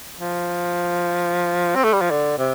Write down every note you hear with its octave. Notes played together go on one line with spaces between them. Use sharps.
F3
C4
A3
G3
F3
D3
C3